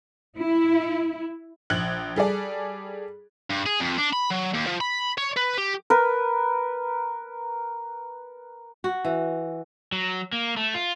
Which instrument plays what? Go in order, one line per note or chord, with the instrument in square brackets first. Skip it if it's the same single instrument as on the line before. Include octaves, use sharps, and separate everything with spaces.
[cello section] E4
[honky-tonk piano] A#1 F#6 G#6 F#7
G3 G#4 A4 D5
[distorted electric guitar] G2
G#4
F2
D4
B5
F#3
D#2
F3
B5
C#5
B4
G4
[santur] A#4 B4
[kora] F#4
E3
[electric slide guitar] F#3
A#3
A3
F4